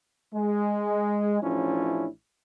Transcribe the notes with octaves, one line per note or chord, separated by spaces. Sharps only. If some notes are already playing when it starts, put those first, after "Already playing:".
G#3
A1 F3 C#4 D4 E4